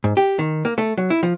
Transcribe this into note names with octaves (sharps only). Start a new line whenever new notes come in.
G#2
G4
D#3
A#3
A3
F#3
E4
F3